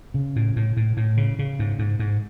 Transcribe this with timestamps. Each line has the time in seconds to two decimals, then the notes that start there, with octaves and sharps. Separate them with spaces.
0.14 C#3
0.36 A2
0.56 A2
0.77 A2
0.97 A2
1.17 C#3
1.39 C#3
1.59 G#2
1.79 G#2
2.00 G#2